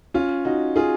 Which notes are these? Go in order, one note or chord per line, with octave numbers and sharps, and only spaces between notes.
C#4 F4
D#4 F#4
F4 G#4